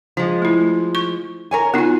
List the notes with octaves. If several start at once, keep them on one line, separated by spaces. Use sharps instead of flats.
F3 G#3
A3 E4
C#6
A#4 C#5 G#5
B3 D#4 F4 F#4 G#5